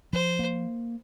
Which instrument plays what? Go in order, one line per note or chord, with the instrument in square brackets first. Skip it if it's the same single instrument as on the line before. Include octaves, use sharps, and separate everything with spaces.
[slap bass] F3 [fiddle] C5
[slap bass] A#3